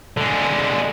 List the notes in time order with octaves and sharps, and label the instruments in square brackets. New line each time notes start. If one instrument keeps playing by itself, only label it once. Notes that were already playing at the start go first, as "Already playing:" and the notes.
[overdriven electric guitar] D3 G#3